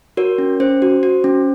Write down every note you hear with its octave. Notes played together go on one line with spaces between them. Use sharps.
F#4 A#4 C#5
C#4
C#4 C5
F#4
F#4
C#4